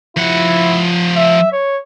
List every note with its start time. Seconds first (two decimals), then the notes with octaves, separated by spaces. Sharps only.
0.17 F3 E4 F#5
1.16 E5
1.52 C#5